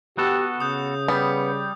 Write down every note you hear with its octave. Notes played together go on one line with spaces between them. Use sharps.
B3 F#4 G4 A4
C#3 D#6 G6
G3 B3